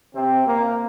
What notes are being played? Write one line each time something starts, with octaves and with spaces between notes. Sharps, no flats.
C3 C4
A#2 A#3